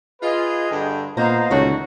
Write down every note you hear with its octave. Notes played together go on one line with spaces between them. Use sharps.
F4 G#4 B4 D#5
G2 D3 G5
A#2 A#3 B3 C5 D#5 F5 A#5
C#2 D3 D#3 A3 C#4 F#4 C#5